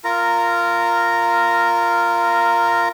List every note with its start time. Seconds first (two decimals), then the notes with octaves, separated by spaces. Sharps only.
0.04 F4 A#4 A#5